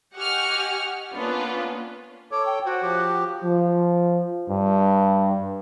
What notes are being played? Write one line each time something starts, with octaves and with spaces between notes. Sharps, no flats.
G4 D#5 F#5 G#5 C#6 F6
A#3 B3 C#4 D4 F4 B4
A4 C#5 D6
G5
F#4 C5
F3 G4
F3
G2